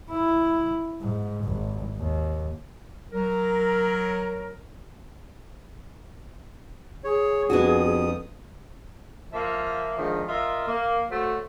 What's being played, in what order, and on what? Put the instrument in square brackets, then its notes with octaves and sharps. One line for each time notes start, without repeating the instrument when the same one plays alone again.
[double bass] E4
G#2
G#1
D#2
[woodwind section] F#3 A#4
[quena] G#4 [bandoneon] C#5
[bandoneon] F2 D#6 [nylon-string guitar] B3 D4 F#4
[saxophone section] F3 A#3 E5
D3 D#3 F3 G#3
F4 A#4 D#5 E5
A#3
F#3 A3 F#4 C5